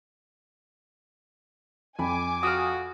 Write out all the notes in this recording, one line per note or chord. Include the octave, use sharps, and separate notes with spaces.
F2 G#5 B5 D6
F#4 F5 D#6